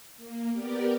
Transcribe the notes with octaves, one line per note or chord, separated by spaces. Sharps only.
A#3
B3 G4 A#4 D5